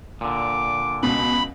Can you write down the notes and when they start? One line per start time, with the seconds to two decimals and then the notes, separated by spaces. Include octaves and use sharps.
0.21 A#2 D3 D6
1.03 C#2 B2 B5